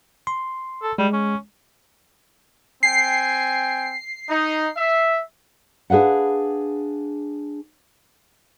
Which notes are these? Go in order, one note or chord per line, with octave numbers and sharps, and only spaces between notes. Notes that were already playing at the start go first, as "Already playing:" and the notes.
C6
A4
G3 G#3
C#4
C4 G5 G#5 C7
D#4
E5
D4 G#4 B4 F5 F#5